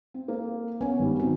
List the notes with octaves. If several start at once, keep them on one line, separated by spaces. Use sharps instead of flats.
C4
A#3 A#4
B3 C#4 G#5
G#1 G3
D#3 F#3 C4 D#4